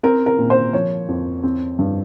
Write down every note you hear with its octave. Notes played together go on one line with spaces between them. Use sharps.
C4 A#4
A#4
A#2
C5
F3 C#5
F2
C4
G2